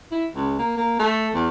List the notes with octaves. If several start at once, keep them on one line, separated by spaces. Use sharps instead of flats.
E4
C#2
A#3
A#3
A3
E2